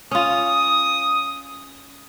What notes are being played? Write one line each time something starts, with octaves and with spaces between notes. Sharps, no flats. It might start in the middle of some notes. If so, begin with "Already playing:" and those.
C#4 F4 D#6